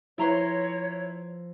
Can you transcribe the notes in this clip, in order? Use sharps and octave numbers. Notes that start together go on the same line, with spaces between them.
F3 E4 B4 C#5 A#5 C6